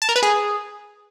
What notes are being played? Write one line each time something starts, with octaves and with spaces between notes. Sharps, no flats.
A5
A#4
B4
G#4